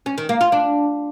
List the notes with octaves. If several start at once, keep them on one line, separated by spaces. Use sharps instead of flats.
C#4
D#3
A#3
F4
D4